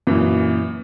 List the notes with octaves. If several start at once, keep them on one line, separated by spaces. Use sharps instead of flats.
F#2 A#2 E3